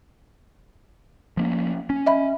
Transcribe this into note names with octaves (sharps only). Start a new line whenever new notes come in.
F3 A#3 C#4
C#4
D#5 E5 B5